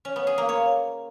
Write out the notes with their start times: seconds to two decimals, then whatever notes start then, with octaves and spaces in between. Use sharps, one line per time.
0.05 C#4
0.16 B3
0.27 G#4
0.38 A#3
0.49 C#5